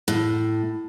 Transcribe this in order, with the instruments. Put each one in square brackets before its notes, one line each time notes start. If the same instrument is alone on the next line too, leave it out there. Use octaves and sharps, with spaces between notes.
[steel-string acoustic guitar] A2